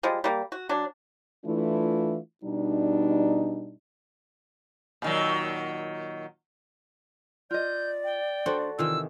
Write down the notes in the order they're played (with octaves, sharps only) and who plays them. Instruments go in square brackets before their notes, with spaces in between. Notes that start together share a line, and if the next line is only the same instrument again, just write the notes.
[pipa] F3 G3 G#3
G3 A#3
F#4
F#3 D4
[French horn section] E3 A3 D4 E4 F4
B2 G3 D4 D#4
[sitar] A#2 D#3 F#3
[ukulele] F4 D#5 [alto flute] D5 [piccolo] G6
[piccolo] G5
[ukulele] D4 C5 [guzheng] F#4 A4 F#5
[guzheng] C3 D#3 E3 [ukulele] F4 [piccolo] E6